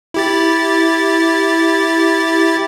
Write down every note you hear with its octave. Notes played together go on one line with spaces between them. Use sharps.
E4 G4 A6